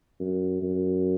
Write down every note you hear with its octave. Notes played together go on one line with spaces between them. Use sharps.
F#2
F#2